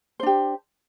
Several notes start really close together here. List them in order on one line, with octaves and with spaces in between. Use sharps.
C5 D4 G4